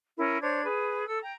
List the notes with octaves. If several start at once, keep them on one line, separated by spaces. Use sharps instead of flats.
C#4 E4 A#4
D4 C5 C#5 G#6
G#4 B4
A4 E6
G5 A#5